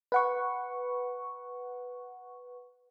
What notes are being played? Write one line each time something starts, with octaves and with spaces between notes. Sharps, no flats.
B4 F#5 C#6